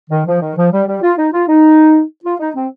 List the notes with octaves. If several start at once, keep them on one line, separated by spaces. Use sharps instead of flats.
D#3
F3
D#3
F3
G3
G3
F4
D#4
F4
D#4
F4
D#4
C4